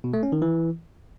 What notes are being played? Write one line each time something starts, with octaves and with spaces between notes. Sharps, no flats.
B2
A3
C#4
D#3
E3